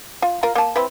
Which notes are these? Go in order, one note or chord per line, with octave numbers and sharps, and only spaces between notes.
F4
F4 A#4 F5
A#3 A5
C4 E4 B4